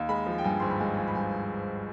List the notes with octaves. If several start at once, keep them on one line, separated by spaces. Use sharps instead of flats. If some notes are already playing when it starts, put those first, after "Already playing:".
Already playing: D#2
G#3 B5
F3
G5
G2 G#5
G#1 C6
B5
G#3 G#5
F3 G#5
B5
G2 G#5